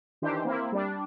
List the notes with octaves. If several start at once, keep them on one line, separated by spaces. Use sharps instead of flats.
D#3 E3 D4 G4 C5
A#3 C4 E4
G3 D4